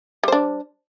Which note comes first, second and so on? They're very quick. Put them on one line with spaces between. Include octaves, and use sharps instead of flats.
G3 C5 D4